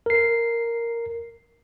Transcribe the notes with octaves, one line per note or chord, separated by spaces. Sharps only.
A#4 C7